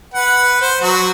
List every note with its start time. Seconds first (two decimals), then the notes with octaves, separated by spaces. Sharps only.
0.14 B4 F#5
0.61 C5
0.81 F#3 F#4